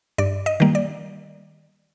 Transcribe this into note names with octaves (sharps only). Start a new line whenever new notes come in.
G2 D5
D#5
D#3 G3 A#3
D5